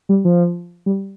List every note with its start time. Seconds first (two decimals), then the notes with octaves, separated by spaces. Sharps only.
0.09 G3
0.25 F3
0.86 G3